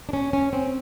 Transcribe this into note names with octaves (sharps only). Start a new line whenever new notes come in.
D4
C#4
C#4
C4